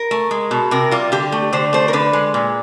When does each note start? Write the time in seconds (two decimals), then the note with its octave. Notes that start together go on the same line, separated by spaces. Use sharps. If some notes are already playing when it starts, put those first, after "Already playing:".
Already playing: A#4
0.11 A3
0.31 G#3
0.51 B2
0.71 C3 A#4
0.91 G3 F4
1.12 D3 G4
1.32 A3
1.53 D3 C5
1.73 A3 C5
1.88 A#4
1.93 D3 B4
2.13 G#3
2.34 A#2